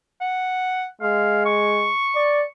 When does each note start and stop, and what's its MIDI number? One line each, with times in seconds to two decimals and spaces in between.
0.21 0.85 78
1.01 1.91 56
1.01 1.45 77
1.46 2.49 85
2.16 2.45 74